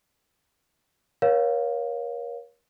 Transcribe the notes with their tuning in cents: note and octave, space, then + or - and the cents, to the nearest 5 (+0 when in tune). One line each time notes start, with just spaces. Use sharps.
A#4 +35 C#5 +0 F5 +15